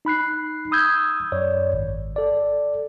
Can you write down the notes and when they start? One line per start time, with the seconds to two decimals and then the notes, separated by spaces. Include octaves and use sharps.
0.05 D#4 B5 F#6 C7
0.71 B5 D#6 E6 G6 G#6
1.32 F#2 C#5 D5
1.73 G#1
2.16 A4 D5